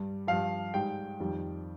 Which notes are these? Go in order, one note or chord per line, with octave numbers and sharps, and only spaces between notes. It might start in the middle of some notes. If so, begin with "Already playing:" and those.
Already playing: G2 G3
G2 F3 F5
G#2 G3 G5
F2 D#3 G3